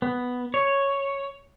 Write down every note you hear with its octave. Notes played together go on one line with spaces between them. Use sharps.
B3
C#5